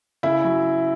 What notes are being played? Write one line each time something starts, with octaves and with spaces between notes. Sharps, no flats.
C#3 E4 E5
F#3